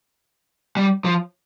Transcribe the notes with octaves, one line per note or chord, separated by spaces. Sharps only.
G3
F3